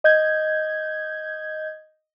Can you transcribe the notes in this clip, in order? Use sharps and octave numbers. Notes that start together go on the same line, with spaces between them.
D#5 G6 G#6